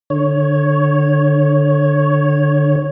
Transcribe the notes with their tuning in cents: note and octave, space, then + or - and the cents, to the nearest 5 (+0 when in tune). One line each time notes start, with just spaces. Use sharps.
D3 +15 C#5 +0